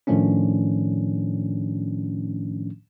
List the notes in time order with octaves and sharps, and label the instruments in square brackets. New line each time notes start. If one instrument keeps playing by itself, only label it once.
[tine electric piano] A2 D#3 F3 A3 C#4 D4